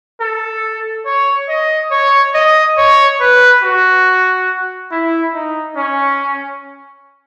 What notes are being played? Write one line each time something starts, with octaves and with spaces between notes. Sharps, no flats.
A4
C#5
D#5
C#5
D#5
C#5
B4
F#4
E4
D#4
C#4